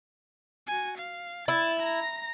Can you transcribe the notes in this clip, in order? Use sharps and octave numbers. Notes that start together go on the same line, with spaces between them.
F#4 G#5
F5
E4 A6
A#5 A#6